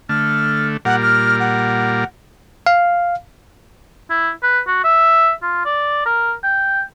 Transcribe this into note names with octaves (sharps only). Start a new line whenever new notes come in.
D3 A3 F6
A#2 G3 A#4 F#5
F6
F#5
F5
E4
B4
F#4
E5
F4
D5
A#4
G5